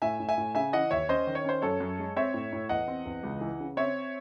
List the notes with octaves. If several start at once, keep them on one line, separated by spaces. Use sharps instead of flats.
A2 E5 G#5
A2
E5 G#5
A2
C#3 E5 G#5
E3 D#5 F#5
D#2 C#5 E5
C#4 C5 D#5
D#3
C#5
C#4 C5
F#2 A4 C#5
F#2
G#3
C4 C#5 E5
A2
A2
E2 D#5 F#5
C4
E2
C#2
E3
C#3
C4 C#5 E5